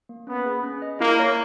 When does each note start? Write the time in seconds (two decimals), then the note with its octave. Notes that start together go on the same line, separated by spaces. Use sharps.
0.09 A#3
0.27 B3 C#4
0.45 G#4
0.63 C#4
0.82 D#5
1.00 A#3 E4
1.19 C#5